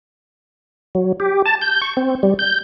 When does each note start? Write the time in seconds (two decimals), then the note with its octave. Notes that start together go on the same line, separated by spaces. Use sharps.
0.95 F#3
1.20 G4
1.46 A5
1.61 G6
1.82 C#6
1.97 C4
2.23 G3
2.39 G6